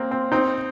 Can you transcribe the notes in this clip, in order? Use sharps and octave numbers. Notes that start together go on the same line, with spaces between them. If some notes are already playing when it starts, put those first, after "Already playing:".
Already playing: A#3 C4
C4
C4 D#4